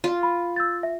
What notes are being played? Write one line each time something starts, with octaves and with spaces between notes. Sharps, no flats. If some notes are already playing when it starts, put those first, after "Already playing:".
F4
B5
E6 G6 A6
E5